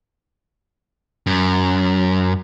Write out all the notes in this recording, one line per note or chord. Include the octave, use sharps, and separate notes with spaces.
F#2